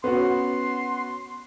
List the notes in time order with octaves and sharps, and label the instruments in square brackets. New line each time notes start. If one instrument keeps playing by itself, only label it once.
[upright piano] B3 C#4 F#4 [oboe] C6